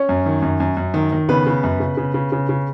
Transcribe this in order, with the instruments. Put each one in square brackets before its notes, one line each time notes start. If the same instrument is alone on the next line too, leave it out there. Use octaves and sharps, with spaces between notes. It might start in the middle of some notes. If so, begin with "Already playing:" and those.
Already playing: [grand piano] C#4 C#5
F#2
D#3
F#2
F#2
F#2
D#3
D#3
C#3 B3 B4
C#3
F#2
C#3
C#3
C#3
C#3
C#3